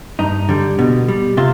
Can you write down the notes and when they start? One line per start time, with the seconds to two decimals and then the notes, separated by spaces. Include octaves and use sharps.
0.19 G2 D#4
0.49 D3 G3
0.79 B2
1.08 G3
1.37 C3 F4